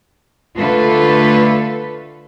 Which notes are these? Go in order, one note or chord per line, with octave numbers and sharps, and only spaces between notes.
D3 A3 F4 A4 B4